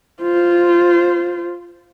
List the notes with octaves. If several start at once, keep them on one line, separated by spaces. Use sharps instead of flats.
F4 C5